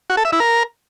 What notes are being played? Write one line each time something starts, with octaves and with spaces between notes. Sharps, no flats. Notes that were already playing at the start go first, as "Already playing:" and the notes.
F#4
A4
E5
E4
A#4